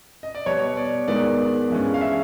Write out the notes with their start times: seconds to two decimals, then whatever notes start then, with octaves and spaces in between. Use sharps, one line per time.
0.23 D#5
0.35 D5
0.46 B2 G3 B3 C#5
0.77 D5
1.08 G#2 D#3 G#3 B3 D5
1.70 G2 E3 G#3 C#4
1.94 F5
2.01 E5